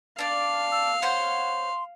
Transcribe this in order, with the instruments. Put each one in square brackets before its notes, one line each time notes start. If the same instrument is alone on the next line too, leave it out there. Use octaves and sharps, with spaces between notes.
[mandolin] D4 D5 [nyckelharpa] F5
[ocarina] E6
[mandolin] C5 C#5 F#5 [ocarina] C6